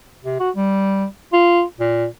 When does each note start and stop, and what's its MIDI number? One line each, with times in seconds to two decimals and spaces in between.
0.24 0.38 48
0.40 0.50 66
0.56 1.05 55
1.33 1.63 65
1.80 2.06 46